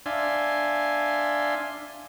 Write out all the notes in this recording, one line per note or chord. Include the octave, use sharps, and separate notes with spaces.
D4 D5 E5 F5 G#5 C6